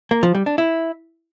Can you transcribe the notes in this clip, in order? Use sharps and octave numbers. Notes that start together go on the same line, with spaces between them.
A#3
F3
G3
D4
E4